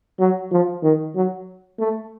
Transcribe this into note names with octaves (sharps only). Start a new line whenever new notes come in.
F#3
F3
D#3
F#3
A3